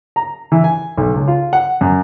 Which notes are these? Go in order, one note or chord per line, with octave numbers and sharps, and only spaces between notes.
A#5
E3
G#5
B1
C#2
F4
F#5
F#2